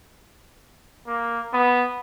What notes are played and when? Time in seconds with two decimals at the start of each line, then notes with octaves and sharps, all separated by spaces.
1.07 A#3
1.54 B3